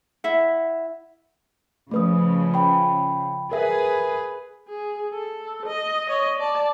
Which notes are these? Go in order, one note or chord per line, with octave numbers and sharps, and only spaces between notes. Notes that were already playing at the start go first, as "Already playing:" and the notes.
E4 E5 F#5
C#3 F3 A3 B4 D#6
G5 B5
G#4 A#4 B4 E5
G#4
A4
D#5
C#5 D#5
D5 A5